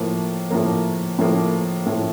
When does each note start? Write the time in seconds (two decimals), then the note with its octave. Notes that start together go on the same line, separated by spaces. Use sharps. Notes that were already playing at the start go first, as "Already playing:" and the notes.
Already playing: A2 F3 A#3
0.50 A2 F3 A#3
1.19 A2 F3 A#3
1.86 A2 F3 A#3